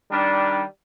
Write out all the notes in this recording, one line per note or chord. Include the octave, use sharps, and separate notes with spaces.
D#3 G3 D4